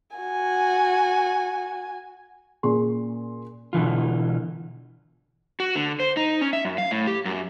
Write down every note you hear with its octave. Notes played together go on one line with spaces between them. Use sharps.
F#4 G#5
A#2 C#4 G#4 C6
B2 D3 E3 F4
F#4
D3
C5
D#4
C#4
E5
F#2
F5
A2
G4
F#2